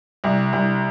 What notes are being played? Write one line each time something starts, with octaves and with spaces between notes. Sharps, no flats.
C2
C2